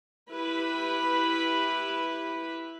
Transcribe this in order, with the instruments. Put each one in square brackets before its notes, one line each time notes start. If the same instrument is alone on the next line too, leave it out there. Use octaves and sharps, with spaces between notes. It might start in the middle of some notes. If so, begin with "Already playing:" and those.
[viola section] E4 G4 B4 B5